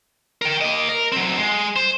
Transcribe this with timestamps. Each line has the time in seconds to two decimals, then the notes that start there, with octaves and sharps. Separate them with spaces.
0.42 A#4 G5
0.61 A#3 D#5
0.89 A#4
1.12 F#3 C4
1.38 G#3
1.76 C5